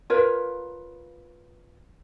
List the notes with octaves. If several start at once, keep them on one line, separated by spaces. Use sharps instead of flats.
F4 A#4 B4 C#5